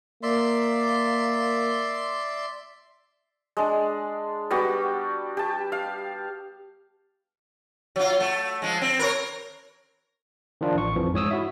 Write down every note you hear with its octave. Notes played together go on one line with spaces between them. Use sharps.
A#3 D5 E5 C6
G#3 D4
G3 B3 F#4 G4
G4 A5
F5
F#3 F4
A3
F3 G#3
C4
A#4 B4 C#5
D#3 F3 D4 F4
A1 C#6
F2 E3 F3
G#2 C#5 D#6 E6
E4 F#4 E5